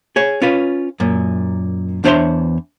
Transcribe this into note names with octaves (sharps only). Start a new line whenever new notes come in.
G#4 C#5
C#4 F4 B4
F#2 A#2
E2 D4 C5 C#5 E5 C6